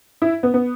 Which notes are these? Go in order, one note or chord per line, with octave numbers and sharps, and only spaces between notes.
E4
B3
B3